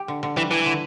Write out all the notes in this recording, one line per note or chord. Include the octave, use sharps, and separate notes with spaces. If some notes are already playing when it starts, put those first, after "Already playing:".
Already playing: G4
D3
D3
E3 G3
E3 D4
D3